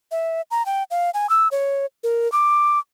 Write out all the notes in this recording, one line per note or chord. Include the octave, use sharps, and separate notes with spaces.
E5
A#5
G5
F5
G#5
E6
C#5
A#4
D6